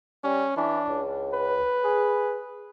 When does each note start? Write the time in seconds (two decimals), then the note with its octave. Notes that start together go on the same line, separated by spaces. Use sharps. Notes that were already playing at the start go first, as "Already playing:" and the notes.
0.24 G3 C#4
0.57 E3 D4
0.89 C#2
1.34 B4
1.84 G#4